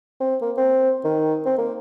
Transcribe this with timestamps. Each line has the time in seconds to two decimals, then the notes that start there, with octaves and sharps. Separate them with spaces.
0.21 C4
0.41 A#3
0.58 C4
1.05 D#3
1.46 C4
1.58 A#3